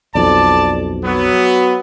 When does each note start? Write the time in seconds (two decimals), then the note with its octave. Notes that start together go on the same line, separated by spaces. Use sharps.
0.15 B1 F2 D5 A5
1.05 F#3 B3